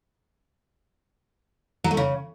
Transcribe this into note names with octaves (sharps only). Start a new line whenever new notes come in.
F#3
A3
C#3